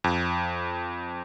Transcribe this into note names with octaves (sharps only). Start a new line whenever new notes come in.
F2